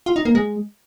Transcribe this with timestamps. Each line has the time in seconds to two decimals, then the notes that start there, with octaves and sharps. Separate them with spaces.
0.06 F4
0.16 D#4
0.25 A#3
0.35 G#3